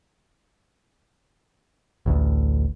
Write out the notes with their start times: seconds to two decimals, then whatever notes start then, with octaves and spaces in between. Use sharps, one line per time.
2.06 A1 D2 A2